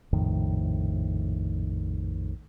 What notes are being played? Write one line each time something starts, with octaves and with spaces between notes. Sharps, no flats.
A#1 F2 A2 D#3